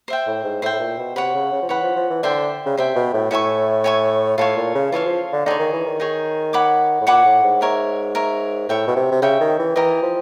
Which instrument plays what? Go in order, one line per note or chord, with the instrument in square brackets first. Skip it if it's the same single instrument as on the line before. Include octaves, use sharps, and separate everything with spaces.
[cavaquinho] C5 E5 G5
[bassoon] A2
G#2
[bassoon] A2 [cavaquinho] C5 E5 G5
[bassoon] A2
A#2
B2
[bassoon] C3 [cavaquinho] C#5 F#5 B5
[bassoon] C#3
C#3
F3
[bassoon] E3 [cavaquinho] C#5 F#5 B5
[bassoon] F3
F3
E3
[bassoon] D3 [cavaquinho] C5 E5 G5
[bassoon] C#3
[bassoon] C3 [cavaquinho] C5 E5 G5
[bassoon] B2
A2
[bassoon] A2 [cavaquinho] C#5 E5 G#5 C#6
[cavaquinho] C#5 E5 G#5 C#6
[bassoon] A2 [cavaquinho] F4 A4 C#5 F5
[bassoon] A#2
C#3
[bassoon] E3 [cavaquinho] F4 A4 C#5 F5
[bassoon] F3
D3
[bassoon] D3 [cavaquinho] D#4 G#4 C#5
[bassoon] D#3
E3
D#3
[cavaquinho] D#4 G#4 C#5
C#5 F#5 B5 D6
[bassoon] A2
[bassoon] A#2 [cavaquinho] C#5 F#5 B5 D6
[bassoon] A2
G#2
[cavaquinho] A#4 C#5 E5
A#4 C#5 E5
[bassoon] A2 [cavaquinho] C#5 E5 G5
[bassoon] B2
C3
C3
[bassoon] C#3 [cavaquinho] C#5 E5 G5
[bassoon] D#3
E3
[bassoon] E3 [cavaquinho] G4 A#4 D#5
[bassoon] F3